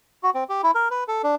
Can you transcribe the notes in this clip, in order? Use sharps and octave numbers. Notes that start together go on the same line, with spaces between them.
F#4
C4
G4
E4
A#4
B4
A4
D4